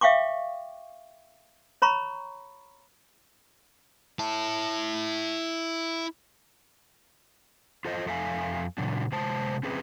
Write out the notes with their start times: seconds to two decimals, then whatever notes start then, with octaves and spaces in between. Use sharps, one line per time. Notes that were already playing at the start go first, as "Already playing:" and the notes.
0.01 E5 F5 G5 C#6 D6
1.82 C#5 A#5 B5 C#6
4.19 E4 A5
7.85 F4 A4 C5 D#5
8.06 F2 A4 E5 F5 G#5
8.78 A#2 C#3 F#3 D4
9.12 C3 G#3 C5 A5
9.63 C4 C#4 G#4 B4